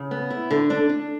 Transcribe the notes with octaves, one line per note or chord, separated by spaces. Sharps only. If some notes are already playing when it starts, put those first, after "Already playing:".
Already playing: C#3
B3
E4
D3
D4
D4